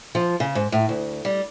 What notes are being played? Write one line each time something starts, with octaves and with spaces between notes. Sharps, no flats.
F3
C#3
G#2
A2
D2
G3